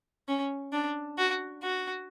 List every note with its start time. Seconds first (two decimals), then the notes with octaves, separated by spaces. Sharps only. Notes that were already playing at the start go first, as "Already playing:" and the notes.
0.28 C#4
0.73 D4
1.18 F#4
1.63 F#4